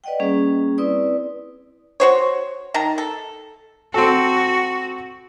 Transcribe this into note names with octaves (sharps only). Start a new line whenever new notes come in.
B4 D5 D#5 F#5 G5
G3 A#3 C#4 G#4
C4 E4 B4 D5 D#6
F#4 C5 C#5
D#3 A5 A#5
A4
C4 F#4 A4